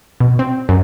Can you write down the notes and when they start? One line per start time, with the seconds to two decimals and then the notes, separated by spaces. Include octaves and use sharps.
0.20 B2
0.39 C4
0.69 F#2